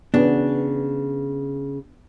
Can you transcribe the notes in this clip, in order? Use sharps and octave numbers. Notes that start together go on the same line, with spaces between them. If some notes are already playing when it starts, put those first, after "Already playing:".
C#3 B3 D4